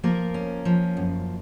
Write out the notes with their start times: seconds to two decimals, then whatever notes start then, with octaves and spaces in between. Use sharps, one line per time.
0.04 F3 A#3 A#4
0.34 C#4
0.65 F3
0.97 F#2